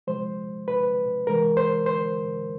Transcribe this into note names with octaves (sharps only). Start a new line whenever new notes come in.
C3 F3 G#3 C5
B4
C3 E3 G#3 A#4
C5
C5